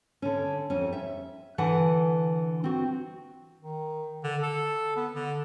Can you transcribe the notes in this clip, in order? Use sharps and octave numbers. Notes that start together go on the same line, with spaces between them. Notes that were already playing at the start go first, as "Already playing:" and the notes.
D3 C#4
F2 C#4
E5
D3 E3 F#5 G#5
C4 F#4
D#3
D3
A4
B3
D3